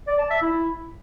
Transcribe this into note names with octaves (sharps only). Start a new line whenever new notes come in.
D5
A5
E5
E4